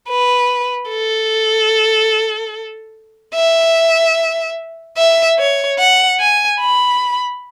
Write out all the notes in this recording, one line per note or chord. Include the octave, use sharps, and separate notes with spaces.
B4
A4
E5
E5
C#5
F#5
G#5
B5